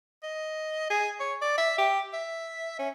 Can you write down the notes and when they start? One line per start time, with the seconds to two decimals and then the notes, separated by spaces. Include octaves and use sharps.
0.23 D#5
0.90 G#4
1.20 C#5
1.42 D5
1.58 E5
1.78 G4
2.14 E5
2.79 C#4